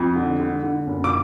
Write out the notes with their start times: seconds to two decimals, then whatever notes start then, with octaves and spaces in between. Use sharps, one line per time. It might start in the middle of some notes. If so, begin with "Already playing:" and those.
Already playing: F2
0.15 D3
0.39 D3
0.63 D3
0.87 F#1
1.04 D6